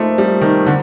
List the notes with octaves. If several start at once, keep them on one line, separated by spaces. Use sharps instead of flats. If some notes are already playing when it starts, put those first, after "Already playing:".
Already playing: F3 A3 A#3 D#4
G3
D#3
D3